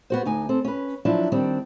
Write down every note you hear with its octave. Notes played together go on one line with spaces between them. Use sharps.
B3 F#4 C5
D2 D#4 G#5
C4 A4
C#4 B4
F3 F#3 D4 E4
D#3 G3 C4 D4